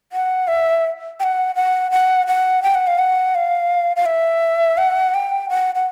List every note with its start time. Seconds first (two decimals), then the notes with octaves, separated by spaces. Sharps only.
0.12 F#5
0.48 E5
1.20 G5
1.24 F#5
1.56 F#5
1.91 F#5
2.27 F#5
2.63 G5
2.75 F#5
2.87 F5
2.99 F#5
3.35 F5
3.96 F5
4.06 E5
4.78 F#5
5.14 G5
5.49 F#5
5.75 F#5